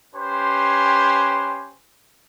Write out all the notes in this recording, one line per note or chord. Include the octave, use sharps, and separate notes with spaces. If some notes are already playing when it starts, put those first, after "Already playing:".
C#4 G4 B4 C5 G#5 C6